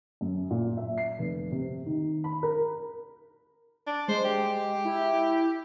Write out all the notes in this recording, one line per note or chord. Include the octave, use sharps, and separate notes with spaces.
F#2
A#2
E5
C7
F1
C3
D#3
B5
A#4
D4
G#3 C5
G4
E4